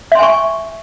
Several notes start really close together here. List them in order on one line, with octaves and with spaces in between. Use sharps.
E5 C6 G#5 C#6